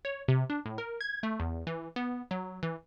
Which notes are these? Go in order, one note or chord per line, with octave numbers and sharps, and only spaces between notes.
C#5
C3
D4
A2
A#4
G#6
A3
E2
E3
B3
F#3
E3